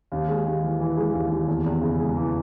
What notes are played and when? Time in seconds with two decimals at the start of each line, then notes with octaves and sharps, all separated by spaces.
0.12 D#2
0.29 G#3
0.46 D#2
0.63 E3
0.80 E3
0.97 G#3
1.14 D#2
1.30 D#2
1.48 E2
1.64 E2
1.81 C#3
1.99 G#3
2.16 E3